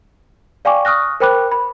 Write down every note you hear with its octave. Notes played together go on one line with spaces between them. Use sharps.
D5 F5 G5 G#5 C#6 D6
C#6 D#6 F6 F#6 A#6
A#4 C5 G5 B5 D6 F#6
B5